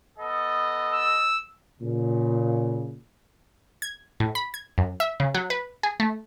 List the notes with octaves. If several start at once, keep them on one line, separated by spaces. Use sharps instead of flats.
B3 A4 D#5
E6
A#2 C#3
G#6
A2
B5
G#6
F#2
E5
C#3
F#3
B4
G#4
A3